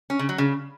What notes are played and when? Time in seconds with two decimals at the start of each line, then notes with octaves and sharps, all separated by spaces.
0.10 C#4
0.19 C#3
0.29 F#3
0.38 C#3